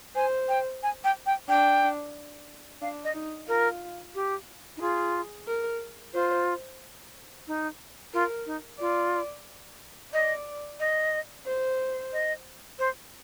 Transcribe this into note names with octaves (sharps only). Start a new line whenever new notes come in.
C5 G#5
G5
G#5
G5
G5
D4 G5
D4 F5
D#5
D#4
F4 A#4
G4
D#4
F4 G#4
A#4
F4 C5
D#4
F4 A#4
D#4
F4 D5
D5 D#5
D#5
C5
D#5
C5